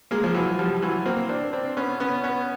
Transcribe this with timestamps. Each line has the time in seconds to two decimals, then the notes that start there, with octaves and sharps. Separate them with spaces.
0.11 G#3 A#3
0.24 F3
0.34 E3 F#3
0.59 F3 G3
0.82 E3 F#3
1.06 A#3 C4
1.29 C4 D4
1.53 C4 D4
1.77 B3 C#4
2.00 B3 C#4
2.24 B3 C#4